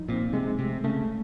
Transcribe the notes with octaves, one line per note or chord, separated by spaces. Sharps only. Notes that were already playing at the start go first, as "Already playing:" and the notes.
Already playing: F3 D#4
A#2 C4
C3 G#3
C3 A3
C#3 A3